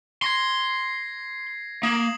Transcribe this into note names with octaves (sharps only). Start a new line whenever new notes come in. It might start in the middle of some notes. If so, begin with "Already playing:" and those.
C6 G#6 A#6 C7
A#3 D#6 E7 F#7